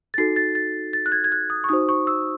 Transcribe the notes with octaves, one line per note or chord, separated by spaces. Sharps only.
A6
D#4 F#4 A4 C7
A6
A6
A6
F#6
G#6
G#6
F#6
D#6
C#6
D#4 F#4 C5 D#6
C#6
E6